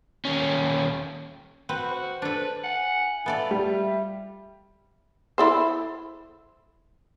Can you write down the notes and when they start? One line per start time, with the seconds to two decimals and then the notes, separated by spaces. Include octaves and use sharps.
0.25 D#2 C#4
1.69 C4 F#4 B4
1.90 C5
2.22 D4 A4 B4
2.64 F#5 G#5
3.26 B3 F4 A4 D5 E5
3.51 G3
5.38 E4 A4 C5